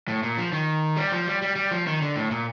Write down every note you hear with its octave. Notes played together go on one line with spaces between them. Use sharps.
A2
A#2
F3
D#3
G3
F3
G3
G3
G3
F3
D#3
D3
A2
A#2